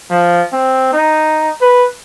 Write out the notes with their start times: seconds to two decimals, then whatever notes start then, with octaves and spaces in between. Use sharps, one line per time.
0.10 F3
0.53 C4
0.93 D#4
1.61 B4